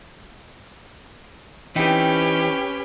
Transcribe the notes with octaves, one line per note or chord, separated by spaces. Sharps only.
E3 C4 C#4 D#4 G4 B4